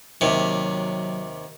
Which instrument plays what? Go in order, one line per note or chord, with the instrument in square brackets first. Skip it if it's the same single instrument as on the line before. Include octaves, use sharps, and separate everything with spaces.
[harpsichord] D#2 C3 [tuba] F#3